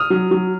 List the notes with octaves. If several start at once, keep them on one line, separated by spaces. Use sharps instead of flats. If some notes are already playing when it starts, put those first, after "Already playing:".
Already playing: D#6 F6
F#3
F#3